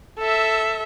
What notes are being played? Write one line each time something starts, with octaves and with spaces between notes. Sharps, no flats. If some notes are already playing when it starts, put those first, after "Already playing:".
A4 E5